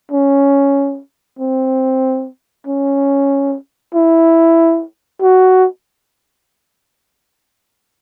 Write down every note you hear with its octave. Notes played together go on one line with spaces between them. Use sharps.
C#4
C4
C#4
E4
F#4